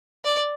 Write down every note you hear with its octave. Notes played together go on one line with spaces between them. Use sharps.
D5